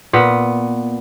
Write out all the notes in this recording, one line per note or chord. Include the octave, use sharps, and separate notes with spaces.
A#2 B3